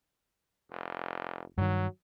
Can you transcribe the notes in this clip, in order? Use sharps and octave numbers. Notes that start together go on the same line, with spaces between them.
F1
G2 D#3 F#3